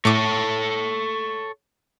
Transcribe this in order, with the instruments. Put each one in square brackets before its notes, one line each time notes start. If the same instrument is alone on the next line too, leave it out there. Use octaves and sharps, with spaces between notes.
[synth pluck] A2 D6 [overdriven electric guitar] A4 C#5